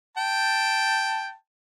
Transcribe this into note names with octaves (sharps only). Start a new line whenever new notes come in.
G5 A5